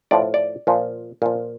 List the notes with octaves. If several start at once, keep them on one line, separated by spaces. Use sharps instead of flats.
A2 F3 D5
D5
A#2 F3
A#2 F3